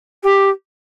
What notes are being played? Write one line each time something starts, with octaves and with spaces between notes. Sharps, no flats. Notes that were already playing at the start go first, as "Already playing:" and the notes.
G4